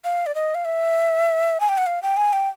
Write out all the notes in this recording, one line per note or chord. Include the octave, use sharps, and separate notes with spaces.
F5
D5
D#5
F5
E5
G#5
G5
F#5
F5
G5
G#5
G5